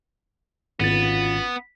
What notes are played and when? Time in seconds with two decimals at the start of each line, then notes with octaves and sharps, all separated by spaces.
0.80 G#1 B2 B3 C#4 F4 A6